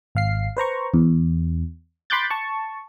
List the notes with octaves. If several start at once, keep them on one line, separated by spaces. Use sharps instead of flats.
G#1 F5 C7
B4 C5 A#5 C#6
E2
B5 C6 D6 F#6 G6 A6
A5 C#6